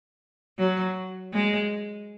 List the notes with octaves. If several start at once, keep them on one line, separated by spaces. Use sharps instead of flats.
F#3
G#3